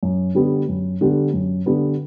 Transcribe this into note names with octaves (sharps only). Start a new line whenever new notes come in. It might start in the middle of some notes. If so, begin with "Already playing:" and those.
F#2
D3 G3 B3
F#2
D3 G3 B3
F#2
D3 G3 B3